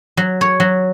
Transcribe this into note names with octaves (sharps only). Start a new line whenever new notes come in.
F#3
C#5
F#3